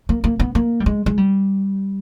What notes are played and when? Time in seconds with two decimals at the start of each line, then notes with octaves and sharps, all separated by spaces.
0.09 A#3
0.24 A#3
0.40 B3
0.55 A#3
0.80 G3
0.86 G#3
1.06 G#3
1.17 G3